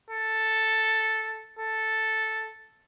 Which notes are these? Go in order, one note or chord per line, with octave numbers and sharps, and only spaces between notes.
A4
A4